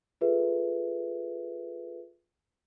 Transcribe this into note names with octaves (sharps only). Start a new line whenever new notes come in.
F4 G#4 A4 B4 E5